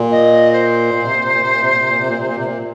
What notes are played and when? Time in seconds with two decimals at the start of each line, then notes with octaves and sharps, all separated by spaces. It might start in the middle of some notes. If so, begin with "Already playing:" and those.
Already playing: A#2
0.11 D#5
0.52 C5
0.94 A#2
1.04 C3
1.14 A#2
1.23 C3
1.32 A#2
1.42 C3
1.51 A#2
1.61 C3
1.70 A#2
1.80 C3
1.89 A#2
1.99 C3
2.08 A#2
2.17 C3
2.27 A#2
2.36 C3
2.46 A#2